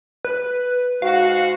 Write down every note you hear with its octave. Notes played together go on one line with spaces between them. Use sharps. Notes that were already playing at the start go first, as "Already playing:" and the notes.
B4
G#2 F#4 F5